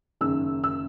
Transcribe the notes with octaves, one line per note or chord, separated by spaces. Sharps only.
F#1 F#2 D#3 E6
E6